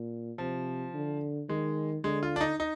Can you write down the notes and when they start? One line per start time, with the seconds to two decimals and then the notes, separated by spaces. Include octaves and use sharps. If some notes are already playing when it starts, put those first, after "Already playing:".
Already playing: A#2
0.38 C3 F3
0.94 D3
1.49 D#3 G#3
2.04 D3 G#3
2.23 F4
2.36 D4
2.41 D#4
2.60 D#4